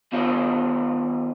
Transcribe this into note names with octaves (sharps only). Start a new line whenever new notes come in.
D#3 B3 D4 F4 C5 D#5